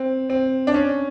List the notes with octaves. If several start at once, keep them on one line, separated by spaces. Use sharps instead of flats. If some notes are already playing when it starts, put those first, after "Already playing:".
Already playing: C4
C4
D4
C#4